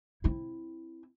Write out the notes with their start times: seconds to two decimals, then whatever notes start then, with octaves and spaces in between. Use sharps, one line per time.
0.24 C4 E4